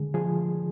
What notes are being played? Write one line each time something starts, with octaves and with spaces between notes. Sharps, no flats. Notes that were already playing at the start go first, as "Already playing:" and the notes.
Already playing: D3 G#3 G#4
F3 G#4